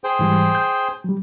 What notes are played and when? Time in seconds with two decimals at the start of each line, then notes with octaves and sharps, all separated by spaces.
0.04 G#4 C5 G5
0.19 G#2 E3 G3
0.55 G6
1.04 F#3 G3